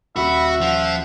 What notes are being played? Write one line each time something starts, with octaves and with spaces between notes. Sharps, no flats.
D#1 F#4 E5 B5
F3 F#5